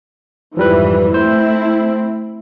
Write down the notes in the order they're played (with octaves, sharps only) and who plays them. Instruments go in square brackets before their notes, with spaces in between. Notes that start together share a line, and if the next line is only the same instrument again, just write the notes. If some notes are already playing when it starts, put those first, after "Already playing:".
[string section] F2 G#2 E3 [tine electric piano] F3 G3 B4
[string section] A3 C4 E4 [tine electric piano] C5